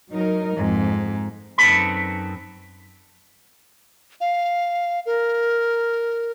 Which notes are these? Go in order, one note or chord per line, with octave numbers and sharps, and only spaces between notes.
F#3 D#4 A#4
F2 G#2
F#2 C4 D#4 A4 B4 B5
F5
A#4